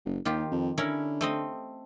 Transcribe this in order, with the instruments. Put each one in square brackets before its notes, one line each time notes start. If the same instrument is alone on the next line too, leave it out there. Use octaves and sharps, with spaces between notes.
[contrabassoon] F#1
[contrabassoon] D#2 [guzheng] D#3 F4 G4
[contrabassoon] F2
[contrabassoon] D3 [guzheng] C#4 E4 A#4
[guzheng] A3 C4 D#5